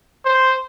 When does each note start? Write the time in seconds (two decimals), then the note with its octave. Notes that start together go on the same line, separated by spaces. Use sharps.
0.25 C5